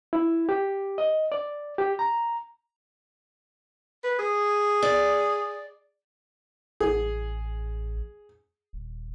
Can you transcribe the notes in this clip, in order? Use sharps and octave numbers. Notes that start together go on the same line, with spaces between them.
E4
G4
D#5
D5
G4
A#5
B4
G#4
D5
A1 G#4
D#1